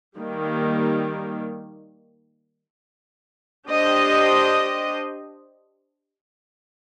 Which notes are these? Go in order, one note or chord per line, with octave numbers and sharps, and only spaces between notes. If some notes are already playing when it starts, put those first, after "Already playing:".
D#3 G3 A#3
D4 G4 C5 D#5